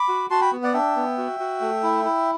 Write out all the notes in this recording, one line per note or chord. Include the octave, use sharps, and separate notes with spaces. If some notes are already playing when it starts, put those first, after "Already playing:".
Already playing: B5 D6
F#4
F#4 A5 C6
G5 B5
B3
D5 F#5
D4 E5 G5
B3
F#4
F#4
A3
E4
E4